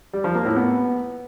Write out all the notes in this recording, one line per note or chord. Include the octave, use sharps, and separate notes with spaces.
G3
F3
A#3
A2
B3